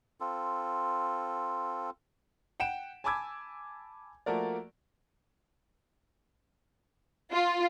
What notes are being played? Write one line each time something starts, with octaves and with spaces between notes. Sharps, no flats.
C4 F4 A4
F#5 G5 D7 E7
G#5 A5 B5 D6 E6 G#6
F3 A3 A#3 F#4 A#4 D5
F4